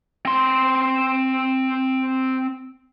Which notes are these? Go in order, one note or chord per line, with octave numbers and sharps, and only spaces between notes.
C4 C6